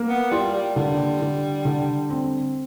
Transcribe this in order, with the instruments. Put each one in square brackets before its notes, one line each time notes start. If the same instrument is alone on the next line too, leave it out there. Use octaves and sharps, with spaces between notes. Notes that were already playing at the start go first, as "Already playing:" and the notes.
Already playing: [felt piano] A#3
[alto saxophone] B3
[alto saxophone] G3 [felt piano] F4
[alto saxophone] G3
[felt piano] D3 [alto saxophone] G3
[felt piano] D3
D3
C4